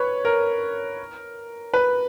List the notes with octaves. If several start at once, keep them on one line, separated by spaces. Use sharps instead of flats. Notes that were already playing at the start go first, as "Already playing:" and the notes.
Already playing: B4 C#5
A#4
B4